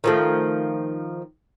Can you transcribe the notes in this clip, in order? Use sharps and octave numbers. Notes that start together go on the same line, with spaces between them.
D#3 F3 A3